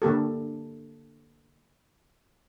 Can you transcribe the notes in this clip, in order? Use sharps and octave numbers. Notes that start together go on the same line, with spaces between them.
D3 A#3 G4 A4